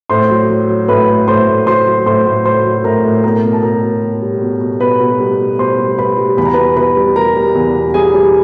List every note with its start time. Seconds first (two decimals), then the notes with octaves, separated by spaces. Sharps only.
0.10 A2 C5 C6
0.30 F#3
0.49 F#3
0.69 F#3
0.88 A2 B4 B5
1.08 A2
1.28 A2 C5 C6
1.47 A2
1.67 F#3 C5 C6
1.86 F#3
2.06 A2 C5 C6
2.26 A2
2.45 F#3 C5 C6
2.65 F#3
2.84 A2 A#4 A#5
3.05 A2
3.23 B2 A#4 A#5
3.44 B2
3.53 A5
3.63 B2 A#4 A#5
3.83 B2
4.02 B2
4.22 G3
4.41 B2
4.61 B2
4.80 B2 B4 B5
5.00 B2
5.20 G3
5.39 B2
5.59 B2 C5 C6
5.78 G3
5.98 G3 B4 B5
6.18 G3
6.37 E2 B5
6.45 A#5
6.54 B2 B4 B5
6.77 B2 B4 B5
6.96 G3
7.16 G3 A#4 A#5
7.36 G3
7.55 E2
7.75 B2
7.94 G3 G#4 G#5
8.14 G3